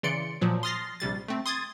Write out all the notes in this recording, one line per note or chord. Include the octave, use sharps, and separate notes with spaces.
C#3 E3 D5 C6 C#7 D7
A#2 F3 F#3
C6 D#6 F6 A6 A#6 C7
A#1 C3 G3 A6
A3 C4
C6 D#6 G#6 A6